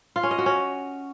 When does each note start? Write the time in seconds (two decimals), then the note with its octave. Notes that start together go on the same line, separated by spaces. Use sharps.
0.16 F4
0.23 C#4
0.31 D#5
0.38 F#4
0.46 C#4